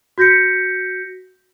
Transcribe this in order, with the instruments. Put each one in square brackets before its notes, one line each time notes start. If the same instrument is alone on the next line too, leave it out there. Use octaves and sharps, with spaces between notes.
[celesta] F#4 G6 A#6 B6 C#7